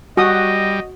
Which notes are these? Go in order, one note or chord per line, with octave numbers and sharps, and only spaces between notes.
G3 F#4 D#5 D#6